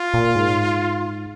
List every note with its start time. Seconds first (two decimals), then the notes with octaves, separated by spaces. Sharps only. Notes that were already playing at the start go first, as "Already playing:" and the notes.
Already playing: F4
0.14 A#2
0.35 G#2